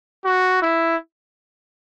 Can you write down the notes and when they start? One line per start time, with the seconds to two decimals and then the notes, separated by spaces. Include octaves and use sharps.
0.24 F#4
0.62 E4